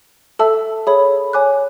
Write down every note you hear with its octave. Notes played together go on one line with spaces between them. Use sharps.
A4 E5 A5 E6
G#4 C#5 E5 B5
C#5 G#5 D6 F#6